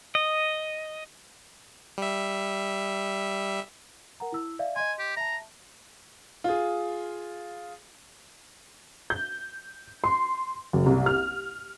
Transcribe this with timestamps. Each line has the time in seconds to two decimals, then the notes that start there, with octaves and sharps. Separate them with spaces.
0.15 D#5
1.98 G3 E5
4.20 A#4 F#5 A#5
4.32 E4 E6
4.59 D5 E5 F5
4.76 D#5 G#5 C6
4.99 G4
5.17 E5 A5 A#5
6.44 F4 G#4
9.10 G6
10.04 C6
10.73 F#1
10.86 C2
11.06 F6